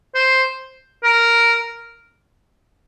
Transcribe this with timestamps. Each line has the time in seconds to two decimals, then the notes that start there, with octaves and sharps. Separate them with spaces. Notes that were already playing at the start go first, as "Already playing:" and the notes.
0.15 C5
1.04 A#4